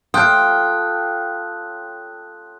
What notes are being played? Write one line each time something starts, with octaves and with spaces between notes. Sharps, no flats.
F4 A4 C#5 G5 D#6 F#6 G6